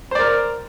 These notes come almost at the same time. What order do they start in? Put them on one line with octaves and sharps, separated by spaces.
C5 D5 A#4